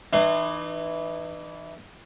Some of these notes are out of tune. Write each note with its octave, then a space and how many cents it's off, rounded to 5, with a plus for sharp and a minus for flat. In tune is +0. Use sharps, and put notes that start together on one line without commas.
E3 +0 D#4 -40 C6 -5